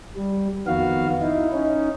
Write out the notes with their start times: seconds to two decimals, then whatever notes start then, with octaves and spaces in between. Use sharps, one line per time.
0.16 G3
0.67 F2 D#3 B3 F#4 F5
1.21 D#4 E4
1.52 C#4 D#4